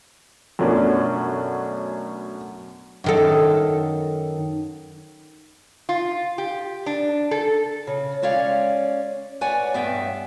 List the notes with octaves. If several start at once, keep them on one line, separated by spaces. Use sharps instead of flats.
F#2 B2 F#3 A3 C#4 D4
F#2 D#3 A4
F4
G4
D4
A4
C#3
G#3 C#4 C#5 D5 F5
B4 C#5 D5 F#5 G#5
G2 B3 E5 G5